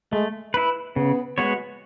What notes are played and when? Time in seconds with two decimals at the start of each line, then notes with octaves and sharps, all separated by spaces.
0.12 G#3 A3
0.54 E4 B4
0.96 C#3 B3
1.38 G#3 B3 F#4 C#5